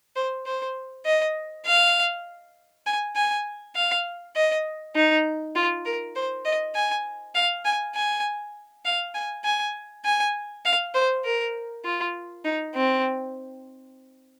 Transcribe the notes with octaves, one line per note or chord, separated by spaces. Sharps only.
C5
C5
D#5
F5
G#5
G#5
F5
D#5
D#4
F4
A#4
C5
D#5
G#5
F5
G#5
G#5
F5
G#5
G#5
G#5
F5
C5
A#4
F4
D#4
C4